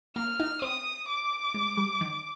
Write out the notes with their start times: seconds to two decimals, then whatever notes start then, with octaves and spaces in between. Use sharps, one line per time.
0.16 A#3 F6
0.40 D#4
0.62 C4 D#6
1.08 D6
1.54 G#3
1.77 G3
2.01 D#3